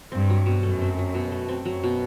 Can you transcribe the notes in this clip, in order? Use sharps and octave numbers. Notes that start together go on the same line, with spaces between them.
G2 C4
F#3
B2
F#2 A3
C4
F#3
B2
A3
C4
F#2 F#3
B2